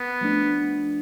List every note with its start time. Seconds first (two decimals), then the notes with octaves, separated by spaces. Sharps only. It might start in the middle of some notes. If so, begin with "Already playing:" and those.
Already playing: B3
0.21 F3 A3 D4